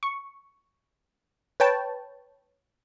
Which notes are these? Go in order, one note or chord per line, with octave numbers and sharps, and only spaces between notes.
C#6
B4 C#5 G5 A5